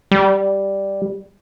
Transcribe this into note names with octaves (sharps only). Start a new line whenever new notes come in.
G3